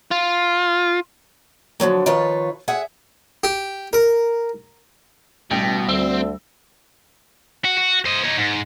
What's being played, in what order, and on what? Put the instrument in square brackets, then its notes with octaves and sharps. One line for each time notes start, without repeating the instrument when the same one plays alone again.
[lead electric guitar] F4
[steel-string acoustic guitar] D3 F3 F#3 A#3
D#3 F3 F4 B4 C#5
G#4 E5 F#5
[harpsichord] G4
A#4
[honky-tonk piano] A1 G5 [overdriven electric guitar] B2 [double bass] G3
[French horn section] D2 [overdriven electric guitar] C4 [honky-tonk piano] E6
[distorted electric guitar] F#4
F#4
C5 D#5
D#4 C#5
G#2